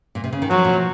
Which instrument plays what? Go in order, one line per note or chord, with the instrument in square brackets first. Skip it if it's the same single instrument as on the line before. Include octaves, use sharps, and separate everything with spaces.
[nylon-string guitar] A#2
C3
C#3
D#3
[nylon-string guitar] F3 [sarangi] F#3
[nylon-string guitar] A#2
C3